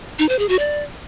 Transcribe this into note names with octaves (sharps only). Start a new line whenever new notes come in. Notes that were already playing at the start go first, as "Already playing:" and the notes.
D#4
C5
G#4
F#4
D5